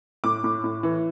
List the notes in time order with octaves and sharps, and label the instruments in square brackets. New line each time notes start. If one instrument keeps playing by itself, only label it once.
[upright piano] A2 D6
A2
A2
E3